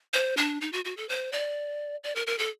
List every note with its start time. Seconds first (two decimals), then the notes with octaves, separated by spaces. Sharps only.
0.13 C5
0.37 D4
0.61 D#4
0.73 F#4
0.85 F#4
0.97 A4
1.09 C5
1.32 D5
2.04 D5
2.16 A#4
2.27 A#4
2.39 A4